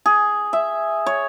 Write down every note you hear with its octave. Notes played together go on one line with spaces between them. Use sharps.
G#4
E5
C#5